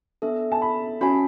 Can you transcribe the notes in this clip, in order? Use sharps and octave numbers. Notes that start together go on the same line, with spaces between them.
B3 D4 A4 E5
A5
B5
C#4 F#4 C#5 G#5 B5